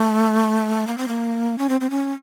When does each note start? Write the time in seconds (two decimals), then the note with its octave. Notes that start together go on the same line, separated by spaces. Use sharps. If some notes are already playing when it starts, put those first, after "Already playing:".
Already playing: A3
0.87 A#3
0.98 C4
1.08 A#3
1.58 C#4
1.69 C4
1.81 C4
1.90 C#4